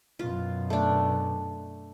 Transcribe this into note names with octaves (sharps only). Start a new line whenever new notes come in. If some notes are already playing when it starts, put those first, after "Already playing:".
F#2 B2 F4
A3 D4